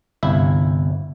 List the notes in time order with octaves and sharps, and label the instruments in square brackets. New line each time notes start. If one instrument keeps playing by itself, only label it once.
[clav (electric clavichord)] G1 C2 E4 E5